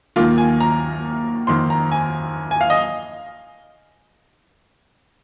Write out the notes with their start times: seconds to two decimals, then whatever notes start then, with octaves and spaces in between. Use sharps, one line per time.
0.16 D#2 D#3 A#3 F4
0.38 G#5
0.60 A#5
1.47 F2 D#3 A#3 C6
1.70 A#5
1.92 G#5
2.51 G#5
2.61 F5
2.70 D#5